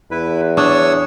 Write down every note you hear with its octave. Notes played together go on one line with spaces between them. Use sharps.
E2 E4 B4
D4 C#5 C#6 D#6 E6